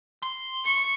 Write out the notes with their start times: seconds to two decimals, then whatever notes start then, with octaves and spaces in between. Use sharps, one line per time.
0.23 C6
0.65 C#6